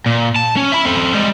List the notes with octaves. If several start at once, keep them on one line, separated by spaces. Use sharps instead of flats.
A#2
A5
C#4
E5 B5
C4 A4
G3 G#3